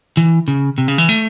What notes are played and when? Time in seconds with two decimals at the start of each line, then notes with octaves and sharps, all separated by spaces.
0.17 E3
0.48 C#3
0.78 C3
0.88 C#3
0.98 E3
1.09 A3